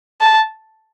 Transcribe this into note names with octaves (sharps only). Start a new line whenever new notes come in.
A5